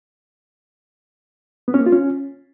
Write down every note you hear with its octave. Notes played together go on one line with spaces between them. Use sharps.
B3
C#4
A#3
F4
C#4